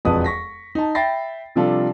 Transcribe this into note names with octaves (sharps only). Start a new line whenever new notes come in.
E1 F2 B4 A5 D#6
C#6 A#6 B6
D#4 A5
E5 G5 B5 A6 A#6 C7
C3 F3 G3 D4 F4 A4